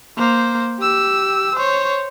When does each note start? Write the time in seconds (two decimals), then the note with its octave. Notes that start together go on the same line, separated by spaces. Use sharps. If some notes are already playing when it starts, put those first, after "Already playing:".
0.18 A#3 C5
0.80 G4 E6
1.56 C5 C#5